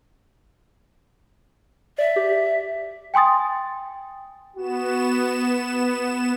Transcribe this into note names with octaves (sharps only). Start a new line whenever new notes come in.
D5 E5
G4
G5 G#5 C6 D#6 A6
B3 F#4 E7